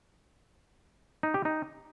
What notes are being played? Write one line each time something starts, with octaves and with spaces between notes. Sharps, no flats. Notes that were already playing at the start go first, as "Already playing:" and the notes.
D#4
G4
D#4